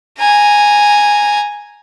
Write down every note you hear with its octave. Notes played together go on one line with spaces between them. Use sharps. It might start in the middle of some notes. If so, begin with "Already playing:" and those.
G#5 A#5